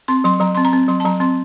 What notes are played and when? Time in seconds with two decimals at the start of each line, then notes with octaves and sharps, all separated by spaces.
0.08 C4 C6
0.24 F#3 C6
0.40 F#3 A#5
0.55 C4 C6
0.65 A#5
0.73 C4
0.88 F#3 C6
1.00 A5
1.05 F#3 A#5
1.20 C4 C6